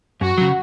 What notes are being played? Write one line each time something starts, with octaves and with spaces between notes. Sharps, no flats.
F#2 F#4
C#3 F#3